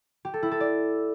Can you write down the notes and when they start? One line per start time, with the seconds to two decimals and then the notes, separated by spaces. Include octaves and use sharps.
0.25 G4
0.34 A4
0.43 E4
0.51 A4
0.60 D5